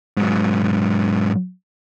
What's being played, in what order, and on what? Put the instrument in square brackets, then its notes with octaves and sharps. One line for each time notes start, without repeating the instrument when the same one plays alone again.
[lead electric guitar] G#2 F#3